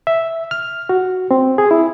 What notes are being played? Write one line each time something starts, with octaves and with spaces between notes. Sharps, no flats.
E5
F6
F#4
C4
G#4
E4